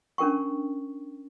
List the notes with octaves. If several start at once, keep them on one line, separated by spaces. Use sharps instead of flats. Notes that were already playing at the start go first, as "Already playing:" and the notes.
C#4 D4 A#4 G5 C#6